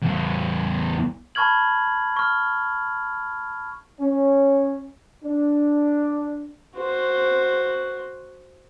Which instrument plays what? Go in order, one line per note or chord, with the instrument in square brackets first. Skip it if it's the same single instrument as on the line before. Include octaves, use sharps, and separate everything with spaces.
[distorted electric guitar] E2 A3
[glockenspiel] A5 B5 C#6 F6 G#6 F#7
C#6 F6
[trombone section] C#4
D4
[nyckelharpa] F#4 C5